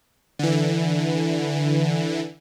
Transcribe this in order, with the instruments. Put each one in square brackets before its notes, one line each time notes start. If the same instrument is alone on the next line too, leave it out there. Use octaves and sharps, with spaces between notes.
[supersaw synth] D3 E3